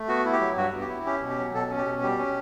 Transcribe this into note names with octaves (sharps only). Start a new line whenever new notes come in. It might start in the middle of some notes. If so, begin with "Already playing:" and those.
Already playing: A3
B3 F#4
E4
G4
F#3
G2 F#4
B3
G4
E4
C#4 G4
B2
G4
F#3
B2 A4
C#4
G4
B2
G3 G4
C#4